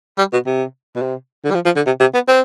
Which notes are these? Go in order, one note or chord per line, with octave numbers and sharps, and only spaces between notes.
G3
B2
C3
B2
C3
D3
G3
F3
F3
D3
C3
C3
B3
C4